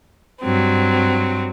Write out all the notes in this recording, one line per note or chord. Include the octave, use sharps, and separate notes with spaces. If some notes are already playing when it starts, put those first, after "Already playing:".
G2 F#3 C4